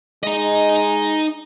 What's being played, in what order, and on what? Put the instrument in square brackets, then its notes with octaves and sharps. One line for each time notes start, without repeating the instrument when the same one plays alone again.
[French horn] G#3 [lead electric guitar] D#4 D#5